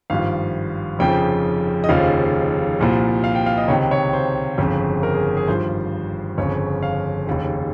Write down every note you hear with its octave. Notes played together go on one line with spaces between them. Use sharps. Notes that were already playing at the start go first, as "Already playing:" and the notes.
G#1 G2 F3 F5
F1 F2 C#3 F3 G5
D#5
F1 D#2 C#3 F3 F5
C2 A#2 F3
F5
G5
F5
D#5
C#2 C3 D#3 C#5
C#5
C5
G1 F2 C#3
A#4
G#4
G#4
G#1 G2 F3 C5
G1 F2 C#3 F3 C#5
F5
F1 D#2 C#3